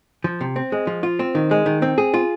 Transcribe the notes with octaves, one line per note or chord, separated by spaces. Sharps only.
F3
C3
C4
G#3
F3
F4
C4
D#3
G#3
D#3
C4
G#4
F4